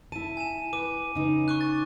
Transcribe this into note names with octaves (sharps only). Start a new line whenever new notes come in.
E4 A5 D#7
G#5 D#7 E7
B4 D6 D#7
C#3 D#4
C#6 D6 F#6
A6